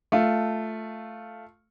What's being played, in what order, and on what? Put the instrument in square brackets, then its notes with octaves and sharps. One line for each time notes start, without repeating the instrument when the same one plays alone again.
[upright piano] A3 F4